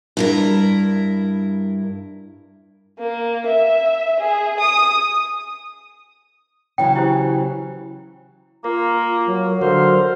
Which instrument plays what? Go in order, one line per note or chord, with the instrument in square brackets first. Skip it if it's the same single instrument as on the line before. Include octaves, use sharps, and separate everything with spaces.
[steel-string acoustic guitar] G2 E4 A#4
[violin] A#3
E5
G#4
D#6
[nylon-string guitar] C#3 E3 F#3 [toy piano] G5
[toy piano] E4 G4 C5
[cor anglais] A#3 [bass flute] F4 [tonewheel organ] A#4
[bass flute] F#3
[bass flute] D3 [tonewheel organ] F#3 A#4 F5 [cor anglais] C5